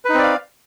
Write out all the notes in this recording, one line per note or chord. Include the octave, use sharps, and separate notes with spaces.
C4 D#4 B4 D5 F5